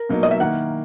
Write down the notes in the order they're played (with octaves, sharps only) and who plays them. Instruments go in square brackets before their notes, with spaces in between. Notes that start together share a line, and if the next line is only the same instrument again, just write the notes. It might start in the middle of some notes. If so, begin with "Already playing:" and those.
Already playing: [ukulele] A#4
[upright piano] B2 F#3 A#3 D#4
[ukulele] D#5
E5
[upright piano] D#3 A#3 E4 [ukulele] F#5